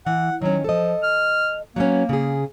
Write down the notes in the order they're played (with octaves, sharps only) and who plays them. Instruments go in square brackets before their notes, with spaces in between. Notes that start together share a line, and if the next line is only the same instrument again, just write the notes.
[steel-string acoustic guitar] E3 [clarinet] F#5
[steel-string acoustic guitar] D#3 C#4 [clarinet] F#3
[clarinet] F3 [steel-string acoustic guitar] A4 D#5
[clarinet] F6
[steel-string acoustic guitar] F#3 B3 C#4 [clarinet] A#3
[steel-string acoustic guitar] C#3 G#4